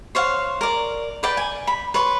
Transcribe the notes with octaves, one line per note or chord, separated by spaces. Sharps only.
C5 C#5 F5 F#5
A#4 D5
B4 D5 G5
G#5
B5
B4 C#5 C6